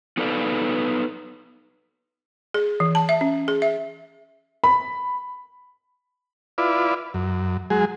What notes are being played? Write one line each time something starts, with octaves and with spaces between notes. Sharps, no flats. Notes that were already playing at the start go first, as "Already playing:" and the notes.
B3 D#4 A4 B4 D5 F5
G#4
E3
A5
E5
C#4
G#4
E5
B5
E4 F4 B4 D5
F#2
F#3 G#3 G#4